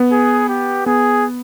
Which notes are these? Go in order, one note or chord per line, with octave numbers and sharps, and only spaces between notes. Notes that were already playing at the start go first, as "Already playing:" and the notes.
Already playing: B3
G#4
G4
B3 G#4